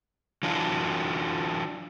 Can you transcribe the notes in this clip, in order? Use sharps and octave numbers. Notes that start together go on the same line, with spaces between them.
E3 F#3 D4 F4